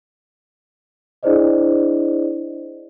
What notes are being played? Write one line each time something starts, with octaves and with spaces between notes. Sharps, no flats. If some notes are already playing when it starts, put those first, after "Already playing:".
D4 E4 G#4 C5 D5 D#5